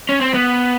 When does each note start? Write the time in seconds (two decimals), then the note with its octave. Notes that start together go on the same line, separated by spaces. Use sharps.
0.09 C#4
0.21 C4
0.34 B3